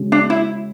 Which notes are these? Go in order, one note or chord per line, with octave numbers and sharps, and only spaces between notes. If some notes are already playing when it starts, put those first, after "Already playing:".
Already playing: C#3 G#3 C#4 F#4
D4
E4